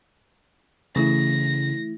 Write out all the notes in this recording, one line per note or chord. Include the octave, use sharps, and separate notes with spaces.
C#3 E3 A3 E4 A#6